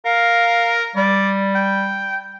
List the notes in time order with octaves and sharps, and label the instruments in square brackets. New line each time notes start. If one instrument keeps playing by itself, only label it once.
[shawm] A#4 [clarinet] F5
[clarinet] G3 [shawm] D5
[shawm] G5